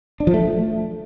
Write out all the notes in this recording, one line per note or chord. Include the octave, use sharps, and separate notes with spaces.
D4
F3
A3